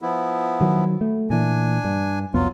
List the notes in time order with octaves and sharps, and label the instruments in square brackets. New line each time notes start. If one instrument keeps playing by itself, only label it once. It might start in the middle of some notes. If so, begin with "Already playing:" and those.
[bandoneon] F3 B3 E4
[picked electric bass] D#3 F#3
A3
[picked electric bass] A#2 E3 [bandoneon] D4 G#5
[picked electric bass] G2
[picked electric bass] C2 F2 B3 [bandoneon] F#3 F4